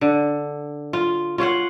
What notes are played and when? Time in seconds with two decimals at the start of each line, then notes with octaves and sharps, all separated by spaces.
0.01 D3
0.93 F4
1.38 F4 C#5 F5 F#5